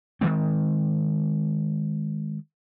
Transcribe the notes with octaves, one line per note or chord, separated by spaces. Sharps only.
D#3 F3 G#3 C4